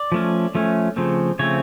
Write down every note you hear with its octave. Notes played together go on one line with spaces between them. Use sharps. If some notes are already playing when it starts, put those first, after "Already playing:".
Already playing: D5
F3 A3 C#4
F3 A3 C#4
C#3 F3 A3 C4
C#3 F3 A3 C4 C#5